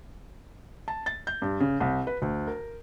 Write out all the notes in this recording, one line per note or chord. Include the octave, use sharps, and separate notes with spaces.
A5
A6
G6
G2
C#3
C2
B4
D2
A#4